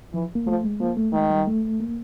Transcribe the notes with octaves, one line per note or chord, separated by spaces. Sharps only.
E3 F3
A#3
F3 A3
G#3
F3 A#3
A3
D#3 G#3
G3
A3
A#3